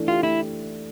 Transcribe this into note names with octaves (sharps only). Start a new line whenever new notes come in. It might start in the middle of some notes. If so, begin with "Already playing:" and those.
Already playing: E3 A3 D4
F4 G4
A3 E4